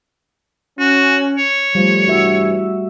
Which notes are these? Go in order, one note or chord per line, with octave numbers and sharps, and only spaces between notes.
C#4 F#4
C#5
F3 G3 A3
G2 C3 E3 F#4 E5